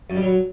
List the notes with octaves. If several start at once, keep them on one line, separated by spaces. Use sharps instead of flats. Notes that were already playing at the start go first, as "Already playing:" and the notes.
F#2
G3
F#3